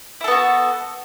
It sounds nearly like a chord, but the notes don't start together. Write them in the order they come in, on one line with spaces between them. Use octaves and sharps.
E4 A4 B3 F#4